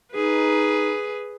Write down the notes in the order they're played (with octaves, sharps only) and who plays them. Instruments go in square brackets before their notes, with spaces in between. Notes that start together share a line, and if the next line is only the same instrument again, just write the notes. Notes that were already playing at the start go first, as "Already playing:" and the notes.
[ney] D#4 [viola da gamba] G#4 B4